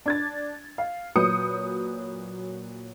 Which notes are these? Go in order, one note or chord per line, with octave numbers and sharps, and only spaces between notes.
D4 G#6 A6
F5
A#2 F#3 B4 D#6 G6 C#7